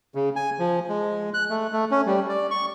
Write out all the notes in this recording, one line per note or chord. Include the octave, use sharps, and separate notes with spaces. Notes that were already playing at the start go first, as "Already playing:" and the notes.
C#3
G#5
F3
G#3
F#6
A3
A3
C#4
G3
D5
C#6